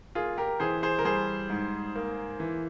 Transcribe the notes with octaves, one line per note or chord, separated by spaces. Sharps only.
A#3 F4 G#4
G4 A#4
E3 G#4 C5
G#4 C5
A#4
G3 G#4 C5
G#2
A#3
E3